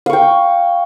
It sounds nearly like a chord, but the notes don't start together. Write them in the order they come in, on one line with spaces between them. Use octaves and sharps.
F5 C#6 G5